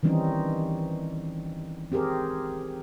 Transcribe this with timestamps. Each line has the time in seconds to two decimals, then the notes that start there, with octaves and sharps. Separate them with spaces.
0.03 D#3 E3 G3 C4 C#4 D#4
1.92 C4 G4 G#4 A#4